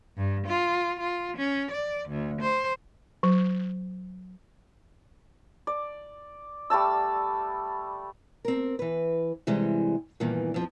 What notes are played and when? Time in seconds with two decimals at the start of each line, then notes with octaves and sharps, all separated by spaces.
0.17 G2
0.47 F4
1.00 F4
1.37 C#4
1.71 D5
2.09 D2
2.41 C5
3.23 F#3
5.67 D5
6.70 G3 A3 A5 E6
8.45 C4 A#4
8.79 E3 B4
9.47 C3 E3 G3 G#3
10.20 E2 G2 A#2 D#3 E3
10.54 F2 F3